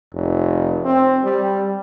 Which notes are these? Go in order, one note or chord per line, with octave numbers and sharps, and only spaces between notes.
F1
C4
G3